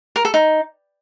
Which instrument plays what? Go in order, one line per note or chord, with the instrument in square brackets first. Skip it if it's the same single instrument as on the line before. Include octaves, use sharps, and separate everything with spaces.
[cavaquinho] A#4
A4
D#4